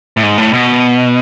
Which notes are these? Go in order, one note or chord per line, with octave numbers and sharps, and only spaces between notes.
A2
G#2
A2
B2